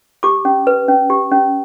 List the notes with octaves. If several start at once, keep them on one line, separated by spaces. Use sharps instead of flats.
G4 D6
C#4
B4
C#4
G4
C#4